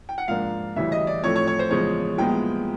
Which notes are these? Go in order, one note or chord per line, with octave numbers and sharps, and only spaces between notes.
G5
F#5
G#2 F3 A#3 D4 F5
D2 C#3 E3 G3 E5
D#5
D5
A2 F3 A3 C4 C#5
C#5
C#5
C5
E2 C#3 F3 G#3 C#5
C2 A#2 F3 G#3 B3 G5